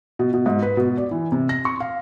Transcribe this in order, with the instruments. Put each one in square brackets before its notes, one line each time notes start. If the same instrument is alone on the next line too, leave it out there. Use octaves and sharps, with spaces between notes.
[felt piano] B2
B2
G#2
B4
B2
D5
E3
C3
A#6
C#6
F5